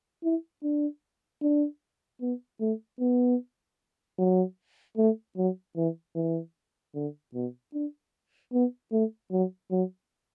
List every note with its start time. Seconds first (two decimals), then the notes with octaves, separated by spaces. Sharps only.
0.23 E4
0.63 D4
1.42 D4
2.21 B3
2.60 A3
3.00 B3
4.18 F#3
4.97 A3
5.37 F#3
5.76 E3
6.15 E3
6.95 D3
7.34 B2
7.74 D4
8.53 B3
8.92 A3
9.32 F#3
9.71 F#3